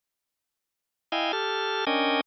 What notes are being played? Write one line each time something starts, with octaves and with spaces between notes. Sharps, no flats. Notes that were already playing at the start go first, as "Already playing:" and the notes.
E4 D#5 F5 G5 G#5
G4 A4 A5 F6
C#4 D4 A#4 D#5 G5 G#5